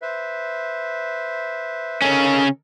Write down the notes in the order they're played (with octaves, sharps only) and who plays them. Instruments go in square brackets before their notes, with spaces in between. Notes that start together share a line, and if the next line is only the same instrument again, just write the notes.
[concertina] B4 C5 E5
[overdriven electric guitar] C#3 C#4 [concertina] D#4 A4 A#4